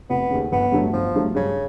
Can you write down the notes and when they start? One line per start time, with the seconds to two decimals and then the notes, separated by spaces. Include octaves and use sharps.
0.10 F1 B3
0.30 D#2 C#3
0.52 G1 B3
0.72 G2 D3 F#3 A3
0.93 G1 F3
1.15 G2 D3 F#3 A3
1.35 G2 C#3